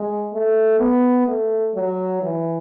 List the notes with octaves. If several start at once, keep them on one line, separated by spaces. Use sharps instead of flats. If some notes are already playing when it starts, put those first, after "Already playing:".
Already playing: G#3
A3
B3
A3
F#3
E3